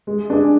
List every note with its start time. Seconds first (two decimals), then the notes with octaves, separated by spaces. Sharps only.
0.07 G#3
0.30 D4 G#4